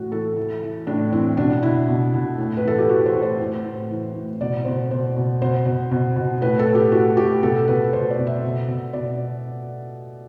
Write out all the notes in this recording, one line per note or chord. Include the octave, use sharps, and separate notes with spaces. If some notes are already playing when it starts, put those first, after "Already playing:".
Already playing: A2 E3 F#4
E3 A4
E3
E3
A2 D4
E3 C4
B2 D4
B2 E4
B2
B2
A2
B4
E3 A4
G4
E3 F#4
C5
A2
C5
A2
A2
E3
A2
B2 D5
B2 C5
B2 C5
B2
B2 C5
B2
B2
B2
A2 B4
A4
A2
G4
A2 F#4
A2 G4
B2 A4
B2 B4
B2 C5
D5
B2
E5
B2
B2
B2 D5